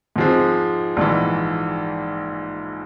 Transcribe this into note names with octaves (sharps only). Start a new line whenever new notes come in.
G#2 F3 G#3 C4
A#1 G#2 E3